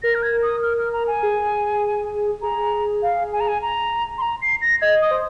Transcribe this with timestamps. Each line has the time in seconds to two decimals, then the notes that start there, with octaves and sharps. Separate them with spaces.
0.03 A#4 A#6
0.15 F6
0.23 G#6
0.43 D#6
0.63 F6
0.78 F6
0.93 A#5
1.07 G#5
1.23 G#4
2.42 G#4 A#5
3.03 F5
3.33 G#5
3.40 A#5
3.48 G#5
3.62 A#5
4.18 C6
4.22 A#5
4.42 C7
4.61 A#6
4.81 D#5 G#6
5.02 D#6
5.11 C5